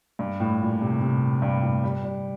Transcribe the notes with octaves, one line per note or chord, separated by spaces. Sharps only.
G2
A2
A#2
C3
C3
G2
A2
G3
G3